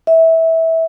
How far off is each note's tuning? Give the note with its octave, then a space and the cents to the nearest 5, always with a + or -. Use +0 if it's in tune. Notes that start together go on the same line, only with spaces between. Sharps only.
E5 -20